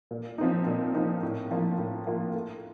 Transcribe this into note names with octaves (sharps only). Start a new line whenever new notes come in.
A#2
F3 C4 D#4
A#2
F3 C4 D#4
A2
F3 A#3 F4
A2
F3 A#3 F4
A3